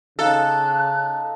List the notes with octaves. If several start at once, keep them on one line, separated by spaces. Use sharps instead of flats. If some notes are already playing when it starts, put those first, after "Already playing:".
C#3 D#4 A4 F5 A5 F#6